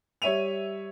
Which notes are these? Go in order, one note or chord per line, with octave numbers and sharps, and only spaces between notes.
G3 C#5 E5 D#7 F7